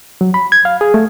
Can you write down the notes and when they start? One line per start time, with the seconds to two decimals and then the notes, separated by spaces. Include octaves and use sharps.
0.21 F#3
0.34 B5
0.52 G#6
0.65 F5
0.81 G#4
0.94 A3